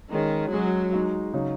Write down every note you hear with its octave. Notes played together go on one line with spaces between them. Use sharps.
D#3 G#3 C#4 G#4
F#3 G#3 C#4 G#4
G#3 D#4 F#4
C#3 F#3 D#4